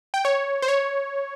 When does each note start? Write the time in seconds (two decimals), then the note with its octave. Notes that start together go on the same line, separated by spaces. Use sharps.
0.14 G5
0.25 C#5
0.62 C5
0.68 C#5